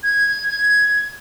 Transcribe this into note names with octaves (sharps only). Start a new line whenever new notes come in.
G#6